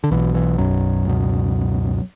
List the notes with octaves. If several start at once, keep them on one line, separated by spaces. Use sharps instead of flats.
D3
B1 B2 E3
E3
F#2 F#3
C#2 B2